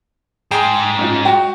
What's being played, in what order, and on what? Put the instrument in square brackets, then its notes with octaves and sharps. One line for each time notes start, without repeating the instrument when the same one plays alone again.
[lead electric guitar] G#2 G#3 [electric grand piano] G#4 G5
[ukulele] C#4 D#4 F4
[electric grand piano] F#4 [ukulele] G5